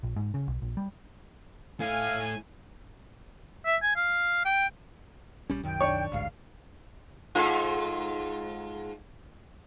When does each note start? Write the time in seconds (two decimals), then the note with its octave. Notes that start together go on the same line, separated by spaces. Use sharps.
0.03 A#1
0.16 G#2
0.34 C#3
0.48 B1
0.62 A#1
0.77 G3
1.80 A3 E4 F5 G#5
3.65 E5
3.82 G#5
3.96 F5
4.45 G5
5.50 A#1 G3 C#4
5.63 C2 F#2 D#3 G5
5.81 D4 C#5
6.12 A1 D2 G#2 F5
7.35 G#2 F4 A4